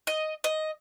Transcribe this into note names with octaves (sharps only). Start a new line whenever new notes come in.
D#5
D#5